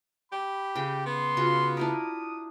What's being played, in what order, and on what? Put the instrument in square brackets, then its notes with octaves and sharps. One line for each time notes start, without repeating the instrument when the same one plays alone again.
[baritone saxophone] G4 [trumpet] B5
[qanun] C#3 G5
[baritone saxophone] B3 [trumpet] C6
[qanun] C#3 F4 F#4
[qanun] D4 E4 A#4 [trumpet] D#6